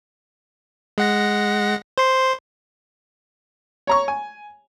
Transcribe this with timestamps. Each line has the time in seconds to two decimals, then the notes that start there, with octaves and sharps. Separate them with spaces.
0.98 G#3 F#5 A#6
1.98 C5 C6
3.87 C#5 A#5 C#6
4.08 G#5